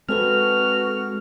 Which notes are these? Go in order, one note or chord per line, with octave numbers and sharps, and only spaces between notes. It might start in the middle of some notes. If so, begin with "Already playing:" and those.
G#3 C4 F#4 A4 B4 F6